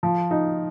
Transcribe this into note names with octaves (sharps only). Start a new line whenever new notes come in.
F3
D#4